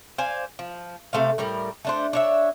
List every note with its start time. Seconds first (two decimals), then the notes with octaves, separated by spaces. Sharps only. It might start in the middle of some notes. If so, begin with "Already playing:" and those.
0.18 C5 D5 F5 G#5
0.59 F3
1.13 C3 A3 C5 F5
1.38 A2 G3 A#4
1.85 A3 D4 C5
2.13 D4 C#5 E5